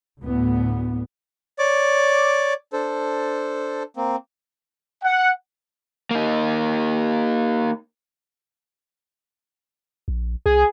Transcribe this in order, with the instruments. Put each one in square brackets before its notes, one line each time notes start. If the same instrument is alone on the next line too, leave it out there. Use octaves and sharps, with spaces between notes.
[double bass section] D2 A2 B3
[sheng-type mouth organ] C#5 D5 D6
D4 A4 C5
A#3 C4
[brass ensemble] F#5
[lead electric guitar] A#3 D#4
[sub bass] A#1
[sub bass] C2 [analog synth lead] G#4